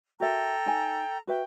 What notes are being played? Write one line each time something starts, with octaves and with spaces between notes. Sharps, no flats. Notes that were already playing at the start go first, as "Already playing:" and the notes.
F#4 A4 A#4 E5 G5 A#5
D#4 G#5
F#4 B4 E5 G5